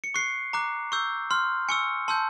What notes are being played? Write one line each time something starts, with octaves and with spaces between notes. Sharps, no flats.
C#7
C#6 F#6 C7
A#5 D6 F#6
C#6 E6 G6
C6 F6
G#5 C#6 E6 C#7
A5 C6 E6 G6